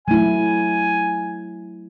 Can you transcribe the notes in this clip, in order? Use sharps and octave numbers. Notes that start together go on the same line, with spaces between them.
F#3 A3 E4 G#5